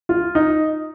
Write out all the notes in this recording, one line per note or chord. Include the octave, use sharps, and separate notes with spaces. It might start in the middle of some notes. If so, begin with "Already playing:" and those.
F4
D#4